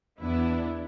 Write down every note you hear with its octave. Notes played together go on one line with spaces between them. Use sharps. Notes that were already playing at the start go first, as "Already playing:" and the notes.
E2 B3 D4 E4